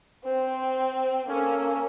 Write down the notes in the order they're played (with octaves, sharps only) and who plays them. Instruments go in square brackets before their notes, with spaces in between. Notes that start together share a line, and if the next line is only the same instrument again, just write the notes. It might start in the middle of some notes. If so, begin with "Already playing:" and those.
[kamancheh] C4 [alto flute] C5
[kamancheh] A#3 [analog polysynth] C#4 [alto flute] A4